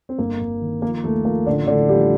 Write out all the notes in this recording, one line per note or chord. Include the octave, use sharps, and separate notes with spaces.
C4
G1 A#3
G1
D#3
F3 A#3
D#2 A3
F3 A#3
A1 D3 D4
A2 D3 D4
F3 G3 G4